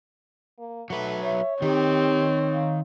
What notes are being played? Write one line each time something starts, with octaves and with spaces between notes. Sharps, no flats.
A#3
F#3 A3 B4
C#5 E5
D#3 C4 D#4 G4
F5